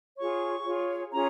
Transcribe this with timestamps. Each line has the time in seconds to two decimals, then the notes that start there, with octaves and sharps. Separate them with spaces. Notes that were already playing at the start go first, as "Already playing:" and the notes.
0.18 F4 G#4 C#5 C#6
0.64 F4 G#4 C#5
1.12 C#4 F4 G#4 C#5 A#5